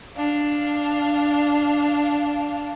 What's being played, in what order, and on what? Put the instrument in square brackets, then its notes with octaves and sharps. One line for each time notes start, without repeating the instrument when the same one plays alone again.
[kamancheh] D4 F5